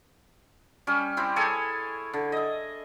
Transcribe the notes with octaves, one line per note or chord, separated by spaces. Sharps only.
G3 C#4
C4 E4 G4
G#4 A4 C#5 G#5
D3
D#5 E5